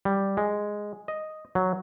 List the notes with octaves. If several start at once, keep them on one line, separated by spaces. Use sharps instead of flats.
G3
G#3
D#5
F#3